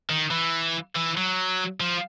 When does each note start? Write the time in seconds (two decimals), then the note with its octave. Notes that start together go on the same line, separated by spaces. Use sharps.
0.09 D#3
0.31 E3
0.95 E3
1.17 F#3
1.80 F3